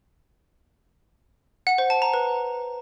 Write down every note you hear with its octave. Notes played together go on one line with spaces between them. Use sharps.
F#5
C5
A5
A#5
B4